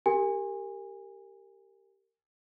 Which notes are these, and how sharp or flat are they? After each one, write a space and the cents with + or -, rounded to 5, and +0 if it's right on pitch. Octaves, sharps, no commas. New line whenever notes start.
G4 +0 A#4 -25 G#5 -25